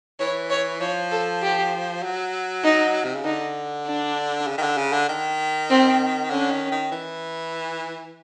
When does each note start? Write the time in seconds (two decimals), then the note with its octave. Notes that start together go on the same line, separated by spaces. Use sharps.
0.20 E3 C#5
0.50 C#5
0.80 F3 C#5
1.11 A4
1.42 G4
2.03 F#3
2.64 D#4
3.04 C3
3.15 C#3
3.25 D3 D#4
3.86 D4
4.47 C#3
4.58 D#3
4.62 D3
4.77 C#3
4.93 D3
5.08 D#3
5.70 C4
6.30 D3 C#4
6.51 D#3
6.71 D#3
6.91 E3